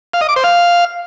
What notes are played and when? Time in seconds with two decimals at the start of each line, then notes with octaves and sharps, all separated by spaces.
0.14 F5
0.21 D#5
0.29 D6
0.36 C5
0.44 F5